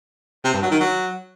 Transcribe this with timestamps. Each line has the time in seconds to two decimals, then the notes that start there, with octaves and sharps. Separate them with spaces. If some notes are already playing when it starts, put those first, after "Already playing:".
0.44 C3
0.53 G2
0.62 F#3
0.71 D#3
0.80 F#3